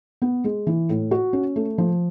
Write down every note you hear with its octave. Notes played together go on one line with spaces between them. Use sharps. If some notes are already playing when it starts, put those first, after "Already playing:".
B3
G#3
E3
A2
F#4
C#4
A3
F3